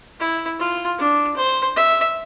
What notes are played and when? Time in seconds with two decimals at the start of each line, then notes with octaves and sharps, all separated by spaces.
0.20 E4
0.59 F4
0.99 D4
1.37 C5
1.76 E5